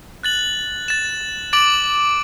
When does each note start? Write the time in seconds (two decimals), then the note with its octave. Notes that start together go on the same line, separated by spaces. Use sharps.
0.23 F#6 A6 F#7
0.88 A6 E7
1.53 D6 A6 D7 F#7